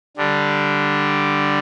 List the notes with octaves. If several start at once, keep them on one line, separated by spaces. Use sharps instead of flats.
D3 G3 D4